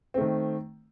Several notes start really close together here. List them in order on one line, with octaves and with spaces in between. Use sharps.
C4 A3 D#3